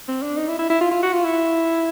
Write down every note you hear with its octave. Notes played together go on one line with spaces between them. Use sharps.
C4
D4
D#4
E4
E4
E4
F4
F4
F#4
F4
E4